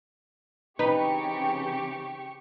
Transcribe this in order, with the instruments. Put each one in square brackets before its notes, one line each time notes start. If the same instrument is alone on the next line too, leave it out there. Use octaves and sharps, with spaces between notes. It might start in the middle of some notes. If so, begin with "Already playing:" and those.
[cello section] C#3 E3 C4 [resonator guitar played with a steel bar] D#4 [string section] G4 C#6 [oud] B4